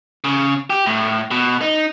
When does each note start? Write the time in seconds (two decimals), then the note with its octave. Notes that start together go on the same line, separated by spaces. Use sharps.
0.24 C#3
0.70 G4
0.86 A2
1.31 B2
1.61 D#4